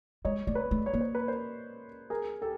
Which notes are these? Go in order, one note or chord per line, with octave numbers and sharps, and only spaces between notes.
G#3 C#5 D#5
A3 D5
B4 C#5
A3
C#5
A#3
C5
B4
A#4 C5
G#4 A#4
G4 A4